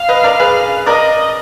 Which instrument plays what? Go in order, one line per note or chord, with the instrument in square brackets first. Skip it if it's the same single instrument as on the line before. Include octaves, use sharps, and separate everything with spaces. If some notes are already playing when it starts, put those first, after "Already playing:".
Already playing: [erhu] F5
[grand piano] B4 D#5
A#4 D5
G#4 B4
[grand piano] A#4 D5 [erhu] D#5